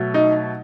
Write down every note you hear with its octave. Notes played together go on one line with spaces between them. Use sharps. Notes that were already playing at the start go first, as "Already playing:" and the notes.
Already playing: B2 F#3 A3
D#4